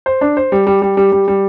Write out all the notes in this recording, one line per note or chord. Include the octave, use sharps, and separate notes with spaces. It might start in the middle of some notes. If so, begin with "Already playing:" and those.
C5
D4
C5
G3
G3
G3
G3
G3
G3